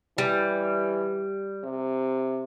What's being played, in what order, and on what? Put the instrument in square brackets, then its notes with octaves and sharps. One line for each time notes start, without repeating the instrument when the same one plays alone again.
[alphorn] E3 [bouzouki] G3
[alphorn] C3